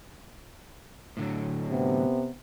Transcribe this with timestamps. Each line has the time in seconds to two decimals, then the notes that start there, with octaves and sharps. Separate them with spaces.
1.17 A2 D3 F#3
1.68 C3 B3